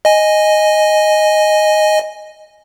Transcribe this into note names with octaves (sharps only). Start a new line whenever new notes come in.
D#5 G#5